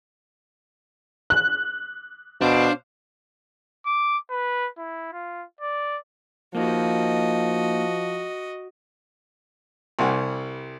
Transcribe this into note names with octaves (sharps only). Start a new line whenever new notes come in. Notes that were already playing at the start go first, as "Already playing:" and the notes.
F#6
B2 D4 C5 F5
D6
B4
E4
F4
D5
F3 A#3 D#4 F#4 D#5
C2 C3 G3 F#5 G#5